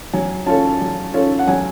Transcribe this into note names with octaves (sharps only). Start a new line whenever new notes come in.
F#3 G#5
C#4 F4 A4 C#5 A5
F#3
C#4 F4 A4 C#5
F#5
F#3 G#5